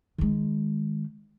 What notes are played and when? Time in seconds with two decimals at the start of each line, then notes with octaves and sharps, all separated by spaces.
0.18 D#3 G#3